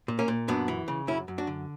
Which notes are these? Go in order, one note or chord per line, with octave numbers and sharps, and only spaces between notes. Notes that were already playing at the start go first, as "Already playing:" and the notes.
A#2
A#3 C#4
A#2
F#2 B3 D4
E3
C#3
F#2 C#4 E4
F#2
D4 F#4
D3